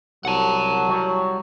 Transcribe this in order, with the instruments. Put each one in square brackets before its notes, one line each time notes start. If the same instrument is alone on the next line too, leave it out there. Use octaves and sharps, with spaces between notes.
[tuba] C2 [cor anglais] F#3 [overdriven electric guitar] F#5 A5
[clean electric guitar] G3 F#4 C#5